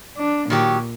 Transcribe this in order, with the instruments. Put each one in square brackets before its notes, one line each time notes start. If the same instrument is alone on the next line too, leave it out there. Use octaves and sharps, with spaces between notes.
[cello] D4
[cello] A#2 [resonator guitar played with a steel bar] D#3 F#3 G4